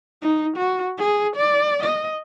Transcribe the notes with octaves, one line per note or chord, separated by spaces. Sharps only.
D#4
F#4
G#4
D5
D#5